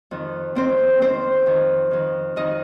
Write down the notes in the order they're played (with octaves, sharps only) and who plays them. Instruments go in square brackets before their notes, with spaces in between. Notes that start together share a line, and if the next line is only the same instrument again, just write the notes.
[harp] F2 D#3
F2 D#3 C4 C5
F2 D#3 C4 C5
F2 D#3
F2 D#3
F2 D#3 D#4 D#5